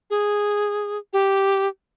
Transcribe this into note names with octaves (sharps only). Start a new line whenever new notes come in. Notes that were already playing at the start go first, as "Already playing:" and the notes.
G#4
G4